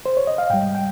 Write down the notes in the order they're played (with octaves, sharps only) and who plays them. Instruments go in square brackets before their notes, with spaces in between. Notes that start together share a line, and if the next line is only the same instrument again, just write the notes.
[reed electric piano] C5
C#5
D#5
F5
G#2 G3 G5
G5